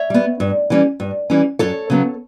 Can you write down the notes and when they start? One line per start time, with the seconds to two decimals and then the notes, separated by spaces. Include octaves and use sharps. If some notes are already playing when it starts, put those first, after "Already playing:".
Already playing: C#5 E5
0.10 G3 B3
0.40 G2
0.70 E3 G3 C#4
1.00 G2
1.30 E3 G3 C#4
1.59 F#2 A4 C#5
1.90 C#3 F#3 B3